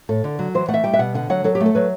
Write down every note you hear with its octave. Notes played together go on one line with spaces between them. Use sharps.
A2 A4
D3
F#3
E3 C5
A3 F#5
E5
G3 G5
E5
B2 F#5
D3 F#5
F#3 F#5
F#3 A4
G4
A3
A4
F#3 B4